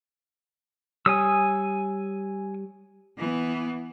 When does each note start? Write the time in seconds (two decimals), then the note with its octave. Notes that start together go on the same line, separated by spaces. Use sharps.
1.06 G3 C#5 G#5 D#6 E6
3.18 E3 B3